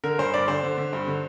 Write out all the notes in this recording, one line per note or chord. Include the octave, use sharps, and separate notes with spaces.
D3 A#4
G2 C5
G2 D5
D3 C5
D3
D3
G2
D3